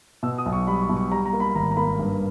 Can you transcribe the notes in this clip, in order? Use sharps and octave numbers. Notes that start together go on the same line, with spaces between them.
B2 E6
D#6
B1
C#6
G3 B5
C#6
B2
C#6
G3 A#5
A#5
A#3
B5
G#1 A#5
A#5
A#3 B5
G2